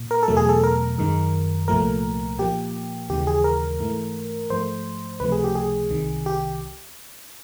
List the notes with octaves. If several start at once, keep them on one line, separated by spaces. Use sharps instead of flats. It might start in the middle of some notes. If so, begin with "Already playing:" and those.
Already playing: A#2
A#4
A4
E2 B2 F#3 A3
G#4
A4
A#4
F#2 D#3 G#3
C2 A#2 F3 A3 A#4
A#2 F3 A#3 G4
D#2 C#3 E3 G#3 G4
G#4
A#4
G#2 E3 A3
G#2 F3 A3 C5
C#2 C3 F3 A3 B4
G#4
G4
G#4
C2 C3 D#3
G4